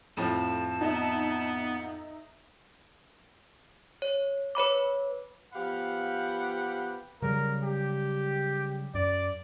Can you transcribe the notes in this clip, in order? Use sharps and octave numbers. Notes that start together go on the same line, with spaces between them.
F2 A2 F3 A5
B3 D#4 E5
C#5
B4 C#5 B5 D6
F3 B3 G4 F5 F#5 B5
C#3 F#3 G3 A#4
G4
F#2 D5